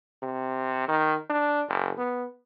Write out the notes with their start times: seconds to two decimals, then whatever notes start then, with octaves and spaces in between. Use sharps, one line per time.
0.22 C3
0.88 D#3
1.30 D4
1.69 F#1
1.98 B3